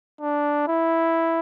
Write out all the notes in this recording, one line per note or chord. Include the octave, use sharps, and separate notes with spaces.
D4
E4